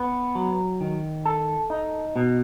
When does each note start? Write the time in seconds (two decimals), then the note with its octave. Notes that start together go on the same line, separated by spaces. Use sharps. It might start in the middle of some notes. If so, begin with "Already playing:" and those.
Already playing: B3
0.35 F#3
0.81 D#3
1.25 A4
1.70 D#4
2.16 B2